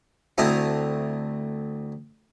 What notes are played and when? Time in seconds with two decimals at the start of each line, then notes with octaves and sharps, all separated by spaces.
0.38 D2 A3 C4 E4 D#5 A#5